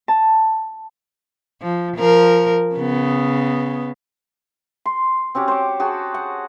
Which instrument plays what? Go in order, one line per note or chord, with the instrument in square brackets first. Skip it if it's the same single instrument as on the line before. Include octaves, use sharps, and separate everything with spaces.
[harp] A5
[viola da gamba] F3
F3 A#4
C#3 B3
[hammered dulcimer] C6
C4 C#4 F#4 G4
C5 C#5 D6
F#4 G#4 G5 A5
F#5